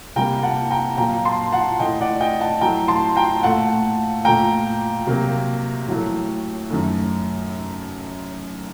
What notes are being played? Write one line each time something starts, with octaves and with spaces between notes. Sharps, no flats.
C3 G3 A#3 G5 A#5
F#5 A5
G5 A#5
A#2 F#3 A#3 G5 A#5
A5 C6
F#5 A5
A2 A3 D#5 G5
D5 F#5
D#5 G5
F#5 A5
A2 F#3 A3 G5 A#5
A5 C6
G5 A#5
A#2 A3 F#5 A5
A#2 A3 G5 A#5
C3 F#3 A#3
A2 F#3 A3
F#2 D#3 A3